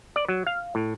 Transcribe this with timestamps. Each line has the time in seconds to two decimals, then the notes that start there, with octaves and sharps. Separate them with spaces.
0.16 D5
0.28 F#3
0.47 F5
0.75 A2